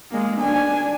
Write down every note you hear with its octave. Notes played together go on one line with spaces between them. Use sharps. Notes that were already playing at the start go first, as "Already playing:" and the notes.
G#3 A#3
D4 G#5